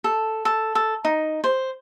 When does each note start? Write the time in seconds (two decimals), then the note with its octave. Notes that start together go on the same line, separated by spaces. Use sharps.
0.04 A4
0.45 A4
0.75 A4
1.05 D#4
1.44 C5